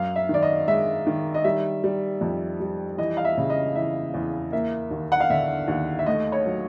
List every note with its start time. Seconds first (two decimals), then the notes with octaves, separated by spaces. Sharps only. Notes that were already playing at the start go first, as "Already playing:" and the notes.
Already playing: F#2 F5
0.16 E5
0.29 D#3
0.34 D5
0.42 D#5
0.68 G#3 E5
1.07 D#3
1.34 D#5
1.44 G3 E5
1.84 G3
2.21 F2
2.60 G3
2.98 E3 D#5
3.17 F5
3.25 E5
3.37 C#3
3.50 D#5
3.75 E3 E5
4.14 E2
4.52 A#3 E5
4.91 D#2
5.12 F#5
5.20 F5
5.30 D3 E5
5.68 D#2
5.99 E5
6.06 A3 D#5
6.32 C#5
6.46 F#3